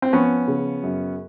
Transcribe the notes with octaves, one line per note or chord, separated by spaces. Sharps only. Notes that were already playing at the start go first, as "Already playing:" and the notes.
C4
F3 B3 C#4
C#3
F#2